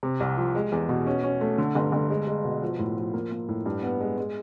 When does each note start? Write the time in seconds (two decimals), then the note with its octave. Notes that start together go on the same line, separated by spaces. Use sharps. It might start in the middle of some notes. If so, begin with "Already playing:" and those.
0.03 C3
0.20 C2
0.37 F3
0.55 G#3
0.72 E2
0.89 B2
1.07 C#4
1.23 C#4
1.41 A3
1.58 D3
1.75 G1
1.92 G1
2.10 G#3
2.27 G#3
2.45 B2
2.62 F3
2.79 A2
2.97 F3
3.14 A#3
3.31 A#3
3.49 A2
3.66 G2
3.83 B3
4.01 G#3
4.18 G#3